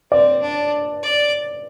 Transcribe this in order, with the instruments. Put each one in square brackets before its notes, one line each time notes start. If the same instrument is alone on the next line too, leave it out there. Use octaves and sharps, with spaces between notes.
[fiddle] C4 [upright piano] D5
[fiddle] D4
D5